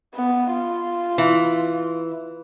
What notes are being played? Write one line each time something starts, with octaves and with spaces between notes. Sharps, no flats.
B3
F4
E3